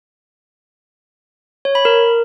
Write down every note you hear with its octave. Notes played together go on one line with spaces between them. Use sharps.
C#5
B5
A#4